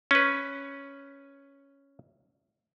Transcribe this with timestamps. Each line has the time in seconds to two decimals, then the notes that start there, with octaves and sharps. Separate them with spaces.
0.11 C#4 B4